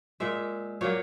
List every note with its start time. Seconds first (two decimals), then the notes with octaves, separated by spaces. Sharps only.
0.20 A#2 G#3 E5
0.81 A#2 F#3 A#3 C#5